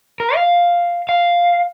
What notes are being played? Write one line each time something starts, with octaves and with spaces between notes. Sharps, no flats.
A#4
F5
F5